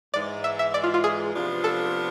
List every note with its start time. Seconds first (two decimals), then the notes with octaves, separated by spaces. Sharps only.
0.14 G#2 E3 G#3 D5
0.44 E5
0.59 E5
0.74 D5
0.84 F4
0.94 F4
1.04 G#4
1.34 C3 F3 B3 D4 F4
1.64 A4